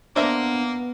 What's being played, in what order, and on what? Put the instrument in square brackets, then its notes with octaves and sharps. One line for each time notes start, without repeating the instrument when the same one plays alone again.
[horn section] A#3 [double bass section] B3 [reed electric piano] D4 [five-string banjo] C5 E5 A#5